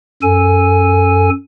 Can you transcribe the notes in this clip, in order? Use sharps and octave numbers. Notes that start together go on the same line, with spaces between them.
F#2 A4 G#5